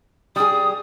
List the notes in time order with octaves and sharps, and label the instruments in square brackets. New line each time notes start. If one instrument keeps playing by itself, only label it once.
[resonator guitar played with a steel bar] G3 G#4 [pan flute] D#6